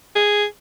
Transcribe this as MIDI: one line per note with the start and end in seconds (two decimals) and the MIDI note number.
0.15 0.45 68